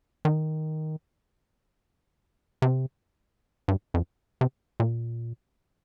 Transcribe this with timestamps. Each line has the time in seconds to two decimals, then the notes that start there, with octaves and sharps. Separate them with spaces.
0.25 D#3
2.62 C3
3.68 G2
3.94 F2
4.41 C3
4.80 A#2